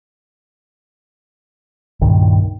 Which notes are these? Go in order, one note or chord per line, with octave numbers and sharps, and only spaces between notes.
C#2 G2 A#2 D#3